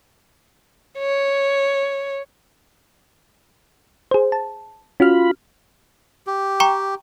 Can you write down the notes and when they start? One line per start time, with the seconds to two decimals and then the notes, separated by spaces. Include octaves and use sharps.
0.99 C#5
4.11 G#4 C5
4.32 A5
5.00 C#4 F4 F#4 B5 F6
6.27 G4
6.60 G5 A#5 C#6